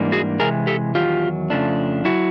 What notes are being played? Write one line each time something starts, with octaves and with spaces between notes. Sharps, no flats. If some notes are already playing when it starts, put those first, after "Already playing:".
Already playing: G#2 E3 G3 A#3 D4
F#4 G#4
C3 E3 G#3 G#4 A#4
G4 A4
E2 C3 D#3 F#3 F4 G4
F2 C#3 F3 A3 D4
C#3 F#3 E4 F#4